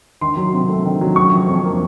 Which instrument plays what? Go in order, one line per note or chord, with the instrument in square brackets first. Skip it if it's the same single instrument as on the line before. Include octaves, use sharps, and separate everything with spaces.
[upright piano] D#3 C6
F#3
C3
A3
D#3
F#3
C#3 C#6
F3
F2
A#3